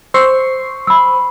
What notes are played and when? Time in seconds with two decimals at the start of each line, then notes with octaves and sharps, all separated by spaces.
0.14 C5 C#6 E6 C7
0.87 B5 E6